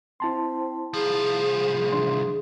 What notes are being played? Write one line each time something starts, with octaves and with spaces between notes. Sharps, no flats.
C4 E4 A5 C6
C2 F3 G#4
E3 D4 C6